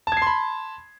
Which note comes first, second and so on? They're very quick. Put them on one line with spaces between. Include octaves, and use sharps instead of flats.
A5 G#6 C7 C6 B5